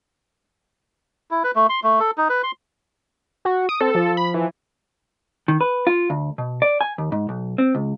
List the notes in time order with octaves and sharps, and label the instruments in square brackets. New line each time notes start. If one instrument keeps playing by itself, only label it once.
[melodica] E4
B4
A3
C6
A3
A4
D#4
B4
C6
[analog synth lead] F#4
[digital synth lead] D#6 [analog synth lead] D7
[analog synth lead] C4 [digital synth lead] A4
[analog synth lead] F3
[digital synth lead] B5
E3
[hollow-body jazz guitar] D#3
B4
F4
D2
B2
D5
G#5
D#2
G#2
B1
C4
C#2